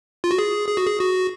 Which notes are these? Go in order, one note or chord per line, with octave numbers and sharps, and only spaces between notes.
F4
F#4
G#4
G#4
F#4
G#4
F#4